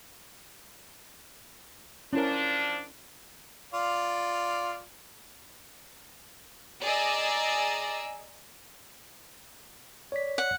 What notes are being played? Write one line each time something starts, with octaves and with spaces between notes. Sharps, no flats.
F3 C#4 D4 E4 A#4
F4 D5 F5
G#4 D5 D#5 G#5 A#5 E6
C#5 D5 B6
F#5